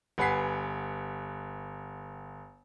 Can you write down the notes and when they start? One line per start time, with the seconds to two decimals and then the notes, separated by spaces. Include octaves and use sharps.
0.18 G1 B4 F#5 G#5 B6 C7